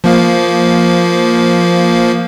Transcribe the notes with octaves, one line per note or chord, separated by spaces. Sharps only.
F3 A#3 F5